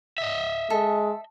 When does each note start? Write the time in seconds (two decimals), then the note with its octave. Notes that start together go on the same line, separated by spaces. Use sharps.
0.18 D#5 E5
0.70 G#3 A4